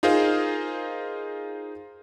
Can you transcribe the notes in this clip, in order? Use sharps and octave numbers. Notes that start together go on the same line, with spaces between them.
D#4 F4 G#4 A#4 C5 F5